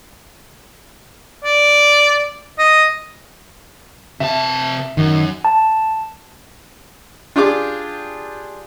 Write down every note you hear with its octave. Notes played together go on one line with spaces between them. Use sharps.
D5
D#5
C3 E5 A5
F#2 D#3
A5
D4 F4 G4 G#4 D6